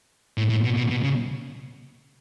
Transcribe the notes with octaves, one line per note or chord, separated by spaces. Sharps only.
A2
A2
B2
B2
B2
C#3